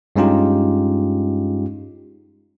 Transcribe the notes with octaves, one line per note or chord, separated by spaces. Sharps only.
G2 G#3 C#4 D#4 F4 G4